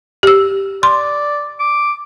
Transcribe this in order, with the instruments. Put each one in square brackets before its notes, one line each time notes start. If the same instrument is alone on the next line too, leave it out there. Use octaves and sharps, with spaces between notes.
[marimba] G4 E6
[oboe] D5 [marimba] C6
[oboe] D6